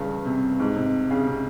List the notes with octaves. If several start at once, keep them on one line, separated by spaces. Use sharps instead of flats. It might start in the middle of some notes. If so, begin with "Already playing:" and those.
Already playing: G2 C#3 E3
C3
G#2
C3
C#3
C3